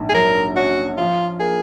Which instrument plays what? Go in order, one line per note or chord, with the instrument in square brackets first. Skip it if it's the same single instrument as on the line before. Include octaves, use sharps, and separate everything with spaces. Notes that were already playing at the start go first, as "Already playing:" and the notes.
Already playing: [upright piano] A#1 G#2
[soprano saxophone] G#4
[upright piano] F#3 [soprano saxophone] A#4
[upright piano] C#4 [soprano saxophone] F#4
[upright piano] F3 [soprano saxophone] F4
[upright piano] A#3 [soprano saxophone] G#4